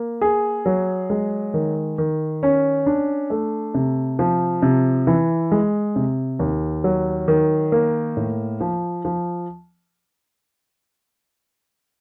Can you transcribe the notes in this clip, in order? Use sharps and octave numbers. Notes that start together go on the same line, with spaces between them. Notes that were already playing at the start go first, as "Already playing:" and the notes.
Already playing: A#3
G#4
F#3
G#3
D#3
D#3
C#4
D4
A3
C3
F3
C3
E3
G#3
C3
D#2
F#3
D#3
A#3
A2
F3
F3